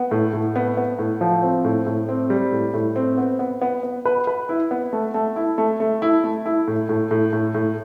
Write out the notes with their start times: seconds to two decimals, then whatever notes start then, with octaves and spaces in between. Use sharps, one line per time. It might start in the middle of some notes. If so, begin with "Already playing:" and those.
Already playing: B3
0.11 A2
0.33 A2
0.56 B3
0.77 B3
0.99 A2
1.21 F3
1.43 C4
1.65 A2
1.87 A2
2.09 C4
2.30 G3
2.52 A2
2.74 A2
2.96 C4
3.18 B3
3.39 B3
3.62 B3
3.83 B3
4.05 B4
4.27 B4
4.49 E4
4.71 B3
4.93 A3
5.14 A3
5.36 E4
5.58 A3
5.80 A3
6.02 E4
6.24 A3
6.46 E4
6.68 A2
6.89 A2
7.11 A2
7.33 A2
7.55 A2